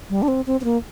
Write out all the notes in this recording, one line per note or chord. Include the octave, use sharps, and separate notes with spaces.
G3
D4
C4
C4
C4
A#3